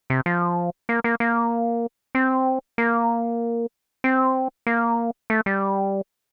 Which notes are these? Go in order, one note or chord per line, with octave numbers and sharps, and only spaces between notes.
C3
F3
A#3
A#3
A#3
C4
A#3
C4
A#3
A3
G3